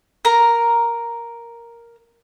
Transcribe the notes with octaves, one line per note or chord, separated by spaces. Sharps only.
A#4 A#5